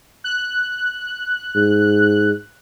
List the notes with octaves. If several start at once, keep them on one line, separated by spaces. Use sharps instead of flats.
F#6
G#2